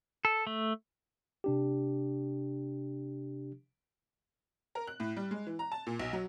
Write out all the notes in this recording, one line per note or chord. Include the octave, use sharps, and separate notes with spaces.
A4
A3
C3 D4 G4
A#4
F#6
A2
G3
G#3
E3
A#5
A5
A#2
B1
F#3